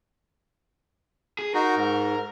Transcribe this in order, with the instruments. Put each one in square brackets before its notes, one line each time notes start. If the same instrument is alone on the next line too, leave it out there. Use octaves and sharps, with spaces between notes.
[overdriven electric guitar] G#4
[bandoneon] D#4 F#4 [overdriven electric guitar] A#4
[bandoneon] G#2